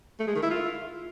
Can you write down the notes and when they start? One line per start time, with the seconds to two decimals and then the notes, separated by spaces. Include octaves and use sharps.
0.20 A3
0.27 G#3
0.35 D#3
0.43 E4
0.51 F4